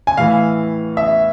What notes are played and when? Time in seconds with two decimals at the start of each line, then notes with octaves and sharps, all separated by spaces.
0.07 G#5
0.17 A2 E3 F5
0.97 E5